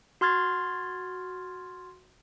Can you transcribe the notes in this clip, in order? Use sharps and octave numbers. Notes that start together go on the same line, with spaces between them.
F#4 C6 F6 G#6 A6